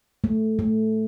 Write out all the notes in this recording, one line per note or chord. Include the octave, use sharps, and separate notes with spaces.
A3
A3